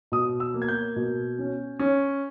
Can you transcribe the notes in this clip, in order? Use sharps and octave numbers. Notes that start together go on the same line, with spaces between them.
B2 D#6
E6
A#3
G#6
G6
B2
C#4
C#4